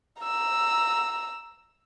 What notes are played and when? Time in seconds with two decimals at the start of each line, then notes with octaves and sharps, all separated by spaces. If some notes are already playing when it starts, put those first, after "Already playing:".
0.22 A#5 E6